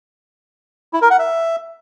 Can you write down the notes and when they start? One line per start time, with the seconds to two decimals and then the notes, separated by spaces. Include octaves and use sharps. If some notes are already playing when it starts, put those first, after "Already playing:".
0.93 E4
1.02 A#4
1.10 F#5
1.19 E5